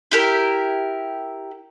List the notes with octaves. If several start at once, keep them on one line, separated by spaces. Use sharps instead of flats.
E4 G4 A#4